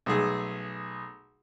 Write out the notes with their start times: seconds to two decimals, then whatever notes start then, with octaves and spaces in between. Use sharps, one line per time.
0.06 B1 A3 G#4